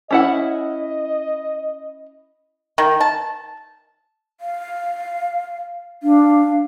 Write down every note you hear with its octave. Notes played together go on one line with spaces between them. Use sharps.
C#4 E4 D#5 F#5
D#3
A5
F5
D4 F5